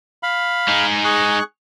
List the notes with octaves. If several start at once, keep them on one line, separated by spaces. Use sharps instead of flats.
F5 B5
G#3 D#4
G#4 C#6 F#6